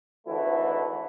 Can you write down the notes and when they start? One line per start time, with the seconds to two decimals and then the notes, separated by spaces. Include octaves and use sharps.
0.27 G#1 D2 E3 A3 E4 A4